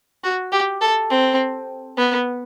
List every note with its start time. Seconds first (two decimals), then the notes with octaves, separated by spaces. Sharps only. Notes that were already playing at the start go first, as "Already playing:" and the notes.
0.24 F#4
0.52 G4
0.81 A4
1.10 C4
1.97 B3